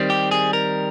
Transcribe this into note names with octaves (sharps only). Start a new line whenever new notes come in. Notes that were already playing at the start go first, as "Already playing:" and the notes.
Already playing: D#3 G3 C4
G4
G#4
A#4